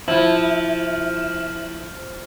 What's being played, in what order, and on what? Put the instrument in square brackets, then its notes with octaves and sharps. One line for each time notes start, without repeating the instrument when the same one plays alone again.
[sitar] F3 [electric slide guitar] E4